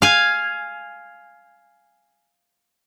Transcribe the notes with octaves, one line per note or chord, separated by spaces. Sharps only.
F5 G#5